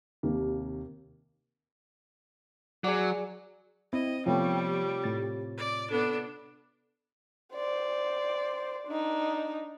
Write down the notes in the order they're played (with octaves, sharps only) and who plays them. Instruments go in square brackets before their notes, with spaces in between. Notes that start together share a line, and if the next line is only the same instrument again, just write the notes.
[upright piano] D#2 C3 A#3
[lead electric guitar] F#3 [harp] G#4 D5
[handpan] C4 [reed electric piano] E4 [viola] D#5
[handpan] C3 F4 C#5 [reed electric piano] F3 A3 B3 [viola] G3 [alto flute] G5
[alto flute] G4
[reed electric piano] A2 A6
[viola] D5
[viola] B3 D4 [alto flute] A4
[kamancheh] C5 D5
D4 D#4